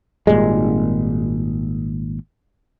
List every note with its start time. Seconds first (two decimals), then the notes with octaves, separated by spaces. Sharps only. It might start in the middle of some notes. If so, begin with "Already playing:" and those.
0.27 G#1 A#2 G3 G#3